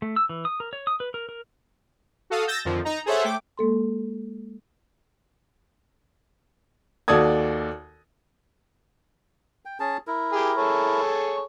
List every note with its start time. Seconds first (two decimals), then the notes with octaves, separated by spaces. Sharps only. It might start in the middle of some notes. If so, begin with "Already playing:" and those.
0.02 A3
0.16 E6
0.29 E3
0.45 D#6
0.60 A#4
0.73 C#5
0.87 D#6
1.00 B4
1.14 A#4
1.29 A#4
2.30 F#4 A4 F5 D#6
2.47 E6 G6 A6 A#6
2.65 F2 D3 D#3 F3
2.85 D#4 A#5
3.06 G#4 A4 C5 C#5 E5 F#5
3.25 A3 G5 D6
3.58 G#3 A#3 A4 C6
7.08 D#2 F#4 A4 D5 D#6 G#6
9.65 G5
9.80 C#4 G#4 A5
10.07 E4 A#4
10.33 G4 G#4
10.58 G#4 A4 C#5